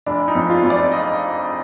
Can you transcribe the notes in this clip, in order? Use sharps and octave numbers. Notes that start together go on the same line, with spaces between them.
F1 D4
D#4
F2
F4
F2
D5
D#5